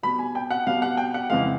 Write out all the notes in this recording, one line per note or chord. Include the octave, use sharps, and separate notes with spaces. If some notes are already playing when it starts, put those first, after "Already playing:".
B2 G3 B5
G#5
G5
F#5
B2 G3 F5
F#5
G5
F#5
F2 C#3 E3 G#3 F5